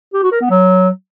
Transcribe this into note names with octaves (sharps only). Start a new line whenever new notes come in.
G4
F#4
A#4
B3
F#3